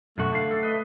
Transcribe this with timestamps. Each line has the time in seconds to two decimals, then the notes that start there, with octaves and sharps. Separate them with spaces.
0.18 F#2 B2 A3 F#4
0.32 D3 F5
0.51 A4
0.63 B4 D#5